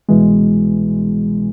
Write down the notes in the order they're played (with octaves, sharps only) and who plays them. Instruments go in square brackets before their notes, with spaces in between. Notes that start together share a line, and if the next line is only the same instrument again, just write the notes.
[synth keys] C2 B2 E3 G#3